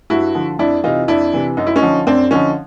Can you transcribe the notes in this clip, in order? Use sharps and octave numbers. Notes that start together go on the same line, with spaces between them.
G2 E4 F#4
D3 F3
F2 D4 E4
C3 E3 D#4 F4
F2 D4 E4
C3 E3
F#2 D#4
E4
C#4 D#4
D3 F3
F#2 C4 D4
D3 F3 C#4 D#4